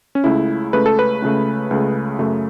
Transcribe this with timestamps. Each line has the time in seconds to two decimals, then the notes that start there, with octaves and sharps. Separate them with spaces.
0.15 C#4
0.24 C#2 C#3 A3 E4
0.73 C#2 C#3 A3 B4
0.86 A4
0.99 B4
1.22 C#2 C#3 A3
1.71 C#2 C#3 A3
2.19 F#2 C#3 A3